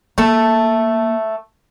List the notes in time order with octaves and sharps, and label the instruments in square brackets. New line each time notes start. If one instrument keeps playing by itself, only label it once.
[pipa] A3 A4 [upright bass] A#3